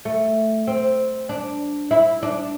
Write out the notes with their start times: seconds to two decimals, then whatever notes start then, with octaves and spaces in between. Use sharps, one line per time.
0.05 A3
0.67 C4
1.29 D4
1.91 E4
2.23 D4